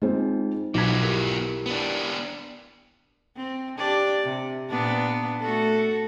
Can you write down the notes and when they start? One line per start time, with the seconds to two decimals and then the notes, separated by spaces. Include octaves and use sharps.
0.02 G#3 C4 D#4 F4 G#4
0.74 B1 F3 B3 D6 G#6 A#6 B6
1.03 E4 G4 A#4
1.66 B3 D4
3.36 C4
3.79 D4 G4 D5
4.24 C3
4.70 A#2 B3 D4
5.40 A3 F#4 A4